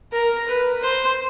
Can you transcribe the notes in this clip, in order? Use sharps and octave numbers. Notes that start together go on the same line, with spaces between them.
A#4
B4
C5